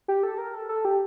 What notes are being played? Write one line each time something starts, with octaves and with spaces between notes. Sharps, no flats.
G4
A4
A#4
A4
A4
G4